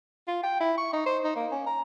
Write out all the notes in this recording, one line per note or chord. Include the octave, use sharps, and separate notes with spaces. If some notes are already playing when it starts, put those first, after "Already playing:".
F4
G5
E4
C#6
D#4
C5
D#4
A#3
C#4
A#5